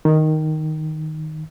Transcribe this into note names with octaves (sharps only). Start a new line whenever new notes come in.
D#3